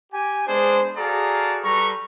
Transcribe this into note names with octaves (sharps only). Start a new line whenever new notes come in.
G4 G#5
G#3 B3 D4 G#4 C5
F#4 G#4 A4 D5 F5 A#5
G3 A4 B4 A#5 C#6